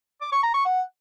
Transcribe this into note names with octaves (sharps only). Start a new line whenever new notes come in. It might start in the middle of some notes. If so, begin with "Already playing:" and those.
D6
C#6
A#5
C#6
F#5